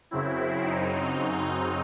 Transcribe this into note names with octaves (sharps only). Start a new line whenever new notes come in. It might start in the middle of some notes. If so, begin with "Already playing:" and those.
F#2 C#3 F#3 C4 E4
D#4